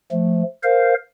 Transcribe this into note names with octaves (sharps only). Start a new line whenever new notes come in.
F3 A3
A#4 C5 F5